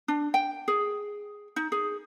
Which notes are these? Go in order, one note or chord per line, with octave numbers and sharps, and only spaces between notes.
D4
G5
G#4
D#4
G#4